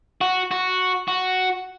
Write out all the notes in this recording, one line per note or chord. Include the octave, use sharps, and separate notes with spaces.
F#4
F#4
F#4